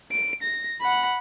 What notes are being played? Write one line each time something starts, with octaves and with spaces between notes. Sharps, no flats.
D7
A#6
F#5 B5